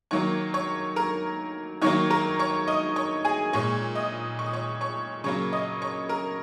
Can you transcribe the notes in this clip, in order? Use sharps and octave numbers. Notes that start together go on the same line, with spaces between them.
D#3 F#3 A#3 C#5 C#6
C#5 C#6
A#4 A#5
D#3 F#3 A#3 C#5 C#6
A#4 A#5
C#5 C#6
D#5 D#6
C#5 C#6
G#4 G#5
A#2 G#3 C#5 C#6
D#5 D#6
C#6
D#6
C#5 C#6
C#5 C#6
C#3 F#3 A#3 C#5 C#6
D#5 D#6
C#5 C#6
A#4 A#5